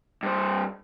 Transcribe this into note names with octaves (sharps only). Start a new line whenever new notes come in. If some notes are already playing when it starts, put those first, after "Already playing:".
G2 C5